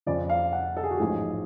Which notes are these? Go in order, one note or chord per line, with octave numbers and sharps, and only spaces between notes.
F2 C#3 F3 D5
F5
F#5
A4
G#4
F#4
A1 G#2 F3 G#3 G#4